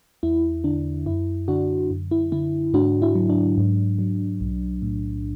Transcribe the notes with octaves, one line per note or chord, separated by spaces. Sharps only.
E2 E4
D3 D4
F#2 E4
D3 D4 F#4
F#2
E4
D3 E4
G#2 D4 F#4
E4
F#3
D4
G#2
F#3
B1
A2